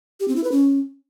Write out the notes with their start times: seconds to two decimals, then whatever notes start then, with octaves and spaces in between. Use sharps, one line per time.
0.20 G4
0.28 C4
0.36 E4
0.44 B4
0.52 C#4